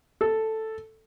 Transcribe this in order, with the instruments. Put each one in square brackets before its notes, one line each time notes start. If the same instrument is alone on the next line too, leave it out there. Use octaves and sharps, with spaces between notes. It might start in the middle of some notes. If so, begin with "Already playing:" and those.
[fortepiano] A4